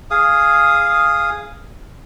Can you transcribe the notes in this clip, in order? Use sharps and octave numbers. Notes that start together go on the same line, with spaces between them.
G#4 F5 D#6